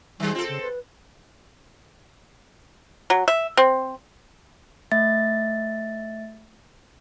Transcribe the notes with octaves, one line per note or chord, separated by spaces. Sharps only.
D#3 G3 G#3
C4 F4 A4
C#3
B4
F#3
E5
C4
A3 E5 A6